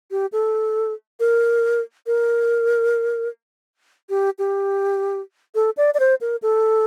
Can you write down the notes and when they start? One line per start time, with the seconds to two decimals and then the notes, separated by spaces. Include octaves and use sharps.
0.11 G4
0.32 A4
1.20 A#4
2.07 A#4
4.10 G4
4.39 G4
5.55 A4
5.77 D5
5.94 D5
6.00 C5
6.21 A#4
6.42 A4